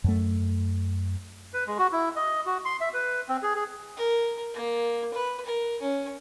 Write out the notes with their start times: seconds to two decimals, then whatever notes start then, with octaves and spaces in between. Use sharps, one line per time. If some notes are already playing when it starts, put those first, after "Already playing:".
0.04 F#2 A3
1.54 B4
1.67 G#3
1.79 F#4
1.92 E4
2.16 D#5
2.46 F#4
2.65 C6
2.80 E5
2.94 B4
3.29 C4
3.43 G#4
3.55 G#4
3.97 A#4
4.54 A#3
5.14 B4
5.45 A#4
5.81 C#4